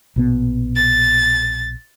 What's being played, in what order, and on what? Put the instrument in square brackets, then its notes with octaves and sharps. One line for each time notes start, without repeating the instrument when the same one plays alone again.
[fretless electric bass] A#1 B2 B3
[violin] A6